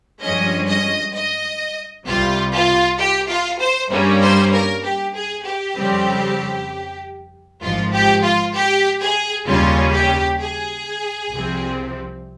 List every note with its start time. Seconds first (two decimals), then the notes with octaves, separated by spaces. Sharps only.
0.21 G2 F3 G#3 C#4 D#5
0.68 D#5
1.13 D#5
2.05 C2 C3 G3 F4
2.52 F4
2.98 G4
3.29 F4
3.60 C5
3.90 G2 G3 A#3 C#4
4.22 C5
4.53 A#4
4.84 G4
5.14 G#4
5.45 G4
5.76 F2 C#3 G3 C4
7.61 G#1 G#2 F3 F4
7.92 G4
8.22 F4
8.54 G4
8.99 G#4
9.46 D#2 C#3 G3 C#4 F4
9.92 G4
10.39 G#4
11.31 C2 C3 F3 C4